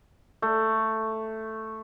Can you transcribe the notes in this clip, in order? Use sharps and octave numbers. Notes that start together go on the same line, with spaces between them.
A3